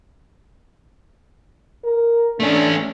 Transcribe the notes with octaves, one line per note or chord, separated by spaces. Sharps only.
A#4
A3 C#4 D4